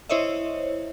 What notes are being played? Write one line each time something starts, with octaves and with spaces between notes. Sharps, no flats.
E4 C5 C#5 D#5 E5